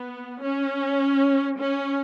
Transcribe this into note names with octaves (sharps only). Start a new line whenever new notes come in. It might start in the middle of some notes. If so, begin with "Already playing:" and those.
Already playing: B3
C#4
C#4